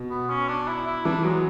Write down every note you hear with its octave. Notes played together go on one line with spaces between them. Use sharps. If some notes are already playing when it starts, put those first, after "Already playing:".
Already playing: B2
B3
C#4
D4
E4
E4
E3 D4
F#3 G#3